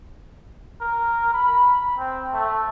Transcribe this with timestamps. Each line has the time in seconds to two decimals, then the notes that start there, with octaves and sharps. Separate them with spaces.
0.81 A#4
1.33 B5
1.98 C4
2.32 A3